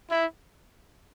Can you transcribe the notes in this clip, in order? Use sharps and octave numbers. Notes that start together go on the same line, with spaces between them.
E4